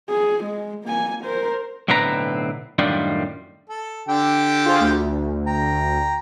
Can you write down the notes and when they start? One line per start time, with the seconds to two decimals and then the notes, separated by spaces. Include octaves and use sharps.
0.10 G#4
0.44 G#3
0.85 A#3 G#5
1.24 A#4 C5
1.88 B1 A2 D3 C4 B4 A#5
2.79 F#2 A2 D#3 G3 D4 F4
3.69 A4
4.08 D3 G4 G5
4.65 F4 G#4 C5
4.80 D2
5.47 G5 A#5